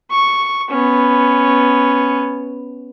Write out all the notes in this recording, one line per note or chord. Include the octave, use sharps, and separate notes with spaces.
C#6
B3 C#4